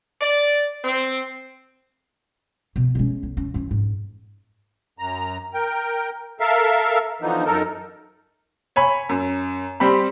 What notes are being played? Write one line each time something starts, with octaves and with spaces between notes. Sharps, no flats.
D5
C4
B2
G#3 C#4
B1
C#4
E3 C#4
G#2
F#2 A#5
A#4 G5
A4 A#4 E5 F5
D3 E3 F3 B3 D#4
F#2 D#4 A4 A#4
C#5 G#5 B5
F#2
G3 C4 G4 B5